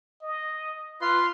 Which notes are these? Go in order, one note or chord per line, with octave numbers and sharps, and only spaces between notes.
D#5
F4 B4 C6